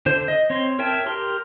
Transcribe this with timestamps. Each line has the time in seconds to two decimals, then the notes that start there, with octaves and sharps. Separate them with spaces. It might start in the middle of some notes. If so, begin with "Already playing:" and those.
0.06 D3 C5
0.28 D#5
0.50 C4 C#5 C6
0.79 A#4 C#5 E5 G5 A5
1.06 G4 A#4 C6